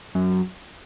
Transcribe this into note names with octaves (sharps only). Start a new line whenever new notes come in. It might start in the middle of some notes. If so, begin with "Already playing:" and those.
F#2